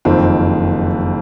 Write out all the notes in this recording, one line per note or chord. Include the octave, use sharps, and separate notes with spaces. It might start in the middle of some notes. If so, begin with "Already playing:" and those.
F#1 F2 D#3 C4